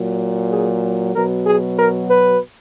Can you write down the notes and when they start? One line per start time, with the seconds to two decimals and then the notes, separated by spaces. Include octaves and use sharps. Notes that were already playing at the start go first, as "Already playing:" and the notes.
Already playing: A#2 F#3
0.51 G#4
1.15 B2 F#3 A#4
1.47 G#4
1.79 A#4
2.11 B4